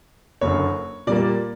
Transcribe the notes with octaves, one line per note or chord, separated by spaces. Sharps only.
F#1 F#2 D3 C#5
A#2 G3 A#3 D5